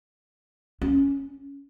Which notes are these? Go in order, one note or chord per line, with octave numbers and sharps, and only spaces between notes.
C#4